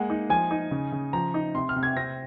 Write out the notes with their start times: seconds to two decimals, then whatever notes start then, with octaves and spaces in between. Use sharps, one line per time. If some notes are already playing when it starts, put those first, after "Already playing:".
Already playing: G#3 A#3 F#5
0.10 D#4
0.30 F3 G#5
0.51 D#4
0.71 C#3
0.92 C#3
1.13 F3 A#5
1.34 D#4
1.55 C3 C6
1.69 F6
1.76 C3
1.83 G#6
1.96 C4 A#6